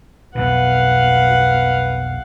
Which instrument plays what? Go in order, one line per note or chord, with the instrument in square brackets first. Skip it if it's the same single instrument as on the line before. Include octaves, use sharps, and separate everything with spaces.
[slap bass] B1 F2 B2 [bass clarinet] B4 [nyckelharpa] F5 F#5